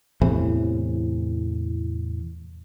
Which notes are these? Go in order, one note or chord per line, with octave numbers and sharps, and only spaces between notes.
E2 A2 C3 E3